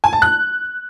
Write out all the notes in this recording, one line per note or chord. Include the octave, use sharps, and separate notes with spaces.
G#5
A5
F#6